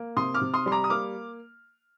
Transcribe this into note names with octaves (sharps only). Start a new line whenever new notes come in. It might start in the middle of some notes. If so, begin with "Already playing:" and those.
Already playing: A#3
C3 C6 D#6
D6 F6
C3
C6 D#6
G3 C6
A#5 D6
D#6
A#3 D6 F6